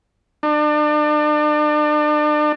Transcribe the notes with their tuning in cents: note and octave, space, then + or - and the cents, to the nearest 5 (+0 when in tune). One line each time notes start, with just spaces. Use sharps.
D4 +35